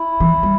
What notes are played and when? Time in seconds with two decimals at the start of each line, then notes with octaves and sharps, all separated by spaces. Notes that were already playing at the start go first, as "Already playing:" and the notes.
Already playing: E4
0.20 E3
0.43 G3